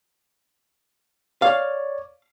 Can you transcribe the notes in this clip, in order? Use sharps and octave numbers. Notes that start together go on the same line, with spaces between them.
C#5 D5 F5